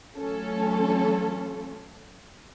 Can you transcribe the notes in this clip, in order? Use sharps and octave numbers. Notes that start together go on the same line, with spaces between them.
E3 F#3 A3 C#4 F4 A4